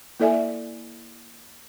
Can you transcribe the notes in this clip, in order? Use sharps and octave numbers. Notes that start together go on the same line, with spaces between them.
A#3 E4 A4 D5 E5 G#5